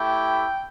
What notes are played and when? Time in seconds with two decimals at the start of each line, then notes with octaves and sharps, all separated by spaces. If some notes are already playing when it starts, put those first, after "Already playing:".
Already playing: A3 E4 G4 G5